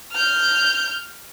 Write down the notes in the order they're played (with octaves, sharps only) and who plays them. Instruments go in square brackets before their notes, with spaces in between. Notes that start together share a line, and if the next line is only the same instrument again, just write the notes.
[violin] F6 G6